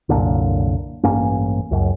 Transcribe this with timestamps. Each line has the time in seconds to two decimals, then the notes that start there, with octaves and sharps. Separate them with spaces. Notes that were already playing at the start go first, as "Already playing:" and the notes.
0.09 C2 F#2 A#2 D3
1.03 A1 G2 A#3 C#4
1.71 C#2 F#2